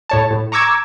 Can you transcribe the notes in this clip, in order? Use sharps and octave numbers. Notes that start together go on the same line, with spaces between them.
A2 C#5 A5
A2
A#5 C#6 D6 E6 G#6